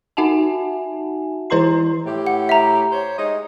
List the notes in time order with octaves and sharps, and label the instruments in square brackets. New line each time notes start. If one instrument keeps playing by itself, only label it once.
[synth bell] D#4 F#4 E5 F#5 G#5 A5
E3 E4 B4 A#5 C6 C7
[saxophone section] A2 G4
[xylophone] F#5
E5 A#5
[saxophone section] C5 C#5
G#3 D#4 D#5